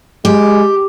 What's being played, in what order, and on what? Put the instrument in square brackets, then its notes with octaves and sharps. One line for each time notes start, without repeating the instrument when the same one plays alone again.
[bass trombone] G#3 [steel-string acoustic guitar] G4